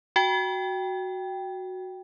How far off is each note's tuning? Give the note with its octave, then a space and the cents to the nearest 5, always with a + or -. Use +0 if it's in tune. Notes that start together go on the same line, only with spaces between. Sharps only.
F#4 +0 G5 +0